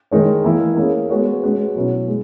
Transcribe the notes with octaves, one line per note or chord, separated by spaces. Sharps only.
D#3 G#3 D#4 A#4 C#5
E3 A#3 E4
A#3 C#4 G#4
G#3 B3 F#4 C#5
G#3 C#4 F#4 B4
B2 F#3 C#4 E4
G#3